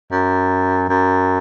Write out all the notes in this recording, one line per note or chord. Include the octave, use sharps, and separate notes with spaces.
F#2
F#2